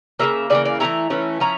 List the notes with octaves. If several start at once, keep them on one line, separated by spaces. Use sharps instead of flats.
C#3 E3 A#3 E5
C#3 E3 A#3 D5
D5
E3 A3 C#4 E4 A#5
E3 A3 C#4 E4
F3 C#4 E4 A#5